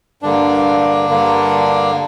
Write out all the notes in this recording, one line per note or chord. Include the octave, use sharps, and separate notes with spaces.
G2 D3 A#3 D4
G2 D3 A#3